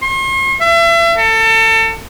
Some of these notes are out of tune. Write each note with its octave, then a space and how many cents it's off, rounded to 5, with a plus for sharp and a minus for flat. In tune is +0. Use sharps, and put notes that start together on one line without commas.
C6 +45
E5 +35
A4 +30